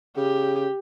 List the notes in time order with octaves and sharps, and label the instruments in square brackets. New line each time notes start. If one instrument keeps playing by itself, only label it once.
[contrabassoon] C#3 [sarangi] G4